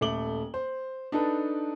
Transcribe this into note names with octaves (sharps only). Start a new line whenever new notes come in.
D#1 A3 D6 F#7 G7
C5
D4 D#4 A4 B4